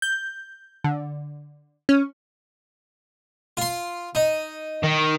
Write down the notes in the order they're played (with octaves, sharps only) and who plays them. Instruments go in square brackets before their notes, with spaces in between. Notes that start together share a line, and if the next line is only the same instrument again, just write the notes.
[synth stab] G6
D3
C#4
[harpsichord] F4 C6
D#4
[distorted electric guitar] D#3